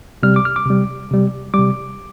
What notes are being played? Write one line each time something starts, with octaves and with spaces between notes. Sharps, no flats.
C3 G3 F6
D6
F6
D6
C3 G3
C3 G3
C3 G3 D6